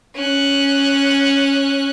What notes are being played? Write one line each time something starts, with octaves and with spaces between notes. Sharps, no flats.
C#4 F#6